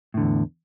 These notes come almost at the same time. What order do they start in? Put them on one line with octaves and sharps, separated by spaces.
A2 D3 E2